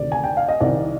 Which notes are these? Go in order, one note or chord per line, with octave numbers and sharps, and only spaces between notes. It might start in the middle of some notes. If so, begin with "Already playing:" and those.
Already playing: D2 C3 D#3 D5
G#5
G5
F5
D#5
C2 C3 D#3 D5